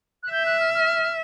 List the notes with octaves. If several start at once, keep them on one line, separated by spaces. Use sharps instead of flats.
F#6
E5 G6
F#6
F6
F6